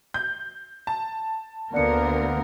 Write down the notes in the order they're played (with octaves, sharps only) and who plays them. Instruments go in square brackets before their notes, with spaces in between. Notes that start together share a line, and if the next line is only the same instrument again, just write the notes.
[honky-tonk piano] G6
A5
[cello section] D2 D3 A#4 [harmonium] A#3 B3 F#5 [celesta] D5 C#7